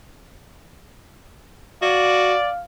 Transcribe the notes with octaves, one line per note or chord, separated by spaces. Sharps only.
F#4 D5 F5